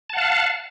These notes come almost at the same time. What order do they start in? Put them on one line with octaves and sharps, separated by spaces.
A5 F#5 F5